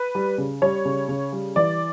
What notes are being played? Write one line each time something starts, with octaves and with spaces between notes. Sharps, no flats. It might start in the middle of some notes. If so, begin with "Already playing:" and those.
Already playing: B4
G3
C#3
G3 C#5
C#3
C#3
G3
E3 D5